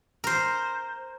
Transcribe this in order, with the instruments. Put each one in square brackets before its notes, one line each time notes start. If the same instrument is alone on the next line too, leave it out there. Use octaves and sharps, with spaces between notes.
[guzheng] A#4 C5